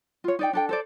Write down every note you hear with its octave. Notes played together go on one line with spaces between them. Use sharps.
F4 C#5
D#4 D5 G5
D4 A4 G5
A4 C5 D5